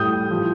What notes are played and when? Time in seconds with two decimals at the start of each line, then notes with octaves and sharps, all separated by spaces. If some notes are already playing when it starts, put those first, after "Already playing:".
Already playing: A2 G3 D#6 G6
0.30 F3